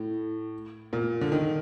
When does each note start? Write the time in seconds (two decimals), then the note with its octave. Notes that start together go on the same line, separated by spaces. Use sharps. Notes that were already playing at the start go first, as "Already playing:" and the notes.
Already playing: A2
0.93 A#2
1.21 D3
1.32 D#3